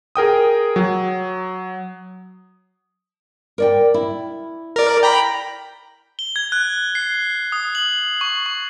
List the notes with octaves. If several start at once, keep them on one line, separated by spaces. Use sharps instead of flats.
G#4 A#4 G5 D#6
F#3
A#4 D5 G5
E4
A#4 D5
G5 A#5 B5
G7
G#6
F#6
C7
D#6
F#7
C#6
C#6